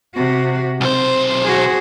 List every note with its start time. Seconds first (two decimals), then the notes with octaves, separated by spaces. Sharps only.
0.15 C3 F#4
0.81 B1 C4 C5
1.44 F#4 G#4